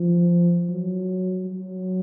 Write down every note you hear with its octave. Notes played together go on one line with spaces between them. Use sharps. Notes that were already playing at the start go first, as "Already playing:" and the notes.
Already playing: F3
F#3
F#3